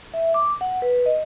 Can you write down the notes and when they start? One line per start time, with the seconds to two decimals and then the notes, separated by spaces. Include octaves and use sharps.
0.14 E5
0.34 D6
0.61 F#5
0.82 B4
1.06 D#5